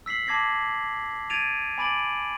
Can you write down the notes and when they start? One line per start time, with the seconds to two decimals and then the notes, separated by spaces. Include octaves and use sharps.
0.06 E6 B6 C7 F#7
0.26 A5 D6 G#6 A#6 C7 F#7
1.30 G#6 A6 D7 D#7 F7
1.78 G#5 B5 D6 A6 D7 F#7